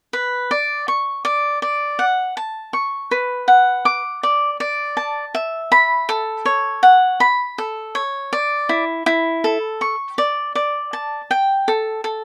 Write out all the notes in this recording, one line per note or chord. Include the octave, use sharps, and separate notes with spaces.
B4
D5
C#6
D5
D5
F#5
A5
C#6
B4
F#5
D6
D5
D5
A5
E5
B5
A4
C#5
F#5
B5
A4
C#5
D5
E4
E4
A4
C#6
D5
D5
A5
G5
A4
A4